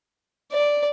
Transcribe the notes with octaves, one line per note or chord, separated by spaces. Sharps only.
D5